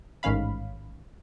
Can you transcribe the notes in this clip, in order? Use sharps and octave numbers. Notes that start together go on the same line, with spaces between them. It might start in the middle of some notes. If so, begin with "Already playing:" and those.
A1 G#2 D#3 C#4 F5 B5